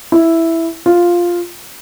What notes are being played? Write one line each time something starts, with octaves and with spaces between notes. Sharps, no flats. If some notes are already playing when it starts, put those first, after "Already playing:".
E4
F4